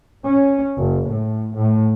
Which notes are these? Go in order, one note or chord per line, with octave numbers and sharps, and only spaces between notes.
C#4
F#1
A2
A2